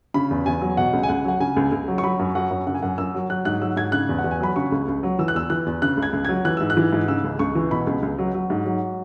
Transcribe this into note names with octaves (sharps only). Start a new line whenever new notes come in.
C#3 B5
E2
E2 G#5
F#3
B2 F#5
C#2
G#5
C#2 F#5
F#3 F#5
C#3 G#5
C#2
C#2
F#3
C#6
F#3 B5
F#2
F#3 F#5
F#2
C#3 F#5
G#5
F#2 F#5
F#2 E6
F#3
F#3 F#6
G#2 F#6
F#3 E6
G#2 G#6
C#3 F#6
E2
F#5
E2
G#5
F#3 B5
C#3 C#6
C#2
C#2
F#3
E3 E6
F#6
E2 E6
E3 F#6
E2
C#3 F#6
C#2
G#6
C#2
F#3 G#6
E3 F#6
G#2 E6
F#6
E3
G#2
C#3 E6
C#2
C#2 C#6
E3
B2 B5
C#2
C#2
F#3
F#3
G#2
F#3